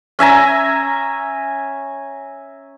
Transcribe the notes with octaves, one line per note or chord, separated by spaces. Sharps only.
C#4 E5 G#5 A#5